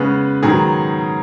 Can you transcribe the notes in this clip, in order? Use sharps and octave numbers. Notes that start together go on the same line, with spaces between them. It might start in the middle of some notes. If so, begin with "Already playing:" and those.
Already playing: C#3 G#3 B3 B4
G#2 D#3 F#3 B3 G#4